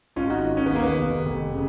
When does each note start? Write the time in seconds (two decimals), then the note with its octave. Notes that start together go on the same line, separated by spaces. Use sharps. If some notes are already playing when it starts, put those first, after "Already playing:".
0.16 G#1 C#4 F4
0.30 D#4 F#4
0.44 D#3
0.57 C#4
0.66 B3
0.71 D#2 A#3
0.83 B3
0.98 F1
1.25 F1
1.53 C#3